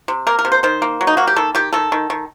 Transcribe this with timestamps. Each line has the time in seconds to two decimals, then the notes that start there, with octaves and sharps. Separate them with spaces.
0.08 C3
0.27 A#3 A#4
0.39 A#4
0.45 C3
0.52 C5
0.63 D#3 C5
0.82 A#3
1.01 F#3
1.07 D#4
1.17 A#3 F#4
1.27 G4
1.36 D#3 A4
1.55 D#3 G4
1.73 D#3 A4
1.92 D#3
2.10 D#3